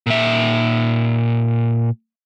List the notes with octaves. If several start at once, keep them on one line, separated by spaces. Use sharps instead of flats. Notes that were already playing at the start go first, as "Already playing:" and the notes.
A#2 E5